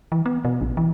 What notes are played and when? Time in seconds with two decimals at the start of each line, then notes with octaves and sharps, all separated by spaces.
0.12 E3
0.26 B3
0.45 B2
0.61 A#1
0.77 E3